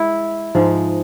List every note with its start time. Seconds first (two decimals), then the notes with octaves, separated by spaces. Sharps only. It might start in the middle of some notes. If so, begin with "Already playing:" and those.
Already playing: G#3 E4
0.55 G#2 F3 G#3